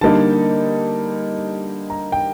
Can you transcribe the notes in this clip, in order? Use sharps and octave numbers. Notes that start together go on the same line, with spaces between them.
D3 G3 A#3 D#4 A5
A#5
G5